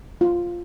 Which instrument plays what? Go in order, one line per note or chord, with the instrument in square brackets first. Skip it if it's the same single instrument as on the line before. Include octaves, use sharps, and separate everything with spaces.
[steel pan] F4